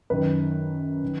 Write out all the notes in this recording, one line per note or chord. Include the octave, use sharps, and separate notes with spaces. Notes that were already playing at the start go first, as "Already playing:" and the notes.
F#2 D#3 B4
D#3